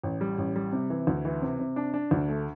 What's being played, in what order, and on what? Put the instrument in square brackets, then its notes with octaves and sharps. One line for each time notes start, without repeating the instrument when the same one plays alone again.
[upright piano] A1
G3
A1
G3
C3
E3
D2
E3
C3
C3
D4
D4
D2
A3